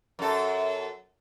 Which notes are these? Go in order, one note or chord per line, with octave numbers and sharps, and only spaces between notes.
F#2 A4